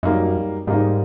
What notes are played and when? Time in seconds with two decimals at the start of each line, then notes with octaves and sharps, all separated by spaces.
0.03 F#2 G3 A#3 D#4
0.67 G#2 G3 A#3 D#4